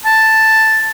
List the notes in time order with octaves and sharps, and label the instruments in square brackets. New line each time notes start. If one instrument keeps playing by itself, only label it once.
[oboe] A5